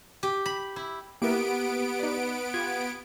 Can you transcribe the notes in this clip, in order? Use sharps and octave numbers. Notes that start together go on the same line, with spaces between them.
G4
B5
E4
A#3 B3 E4 G4 A#4 D7
D#4 D5
F4 G4 G#6